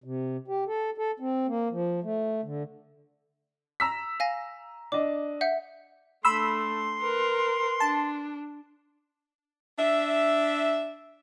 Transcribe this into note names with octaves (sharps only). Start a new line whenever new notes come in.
C3
G4
A4
A4
C4
A#3
F3
A3
D3
A#5 E6 B6
F5 G#5 A#6
D4 D#5 D6
E5 F#5 G6
A3 D4 B5 C6 E6
A#4 B4
D4 A5
D4 E5